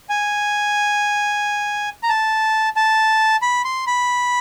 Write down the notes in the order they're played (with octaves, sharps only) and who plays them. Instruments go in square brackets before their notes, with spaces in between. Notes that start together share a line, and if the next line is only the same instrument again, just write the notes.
[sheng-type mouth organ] G#5
A#5
A5
A5
B5
C6
B5